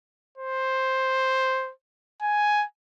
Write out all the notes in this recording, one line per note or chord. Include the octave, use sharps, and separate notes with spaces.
C5
G#5